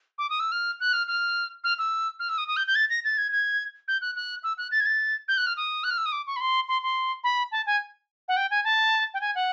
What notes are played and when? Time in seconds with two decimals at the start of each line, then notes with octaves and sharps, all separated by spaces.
0.18 D6
0.30 D#6
0.40 E6
0.52 F6
0.80 F#6
0.93 F6
1.08 F6
1.64 F6
1.78 E6
2.19 F6
2.29 E6
2.38 D#6
2.48 D#6
2.57 G6
2.67 G6
2.75 A6
2.90 A#6
3.04 A6
3.18 G#6
3.32 G#6
3.88 G6
4.01 F#6
4.16 F#6
4.43 E6
4.58 F#6
4.71 A6
4.81 G#6
4.86 A6
5.28 G6
5.37 F#6
5.47 F6
5.57 D#6
5.84 F#6
5.91 F6
5.98 E6
6.06 D#6
6.12 D6
6.27 C#6
6.36 B5
6.41 C6
6.68 C6
6.83 C6
7.24 B5
7.52 A5
7.66 G#5
8.28 F#5
8.37 G5
8.51 G#5
8.64 A5
9.14 G5
9.21 G#5
9.35 F#5